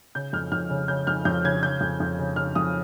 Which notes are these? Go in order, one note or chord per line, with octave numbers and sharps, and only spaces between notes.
C#3 G6
F2 F6
F2 F6
C#3
C#3 G6
F2 F6
F2 G6
C#3 G#6
C#3 G6
F2
F2
C#3
C#3 F6
F2 D#6